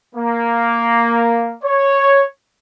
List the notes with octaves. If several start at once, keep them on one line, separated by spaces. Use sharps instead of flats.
A#3
C#5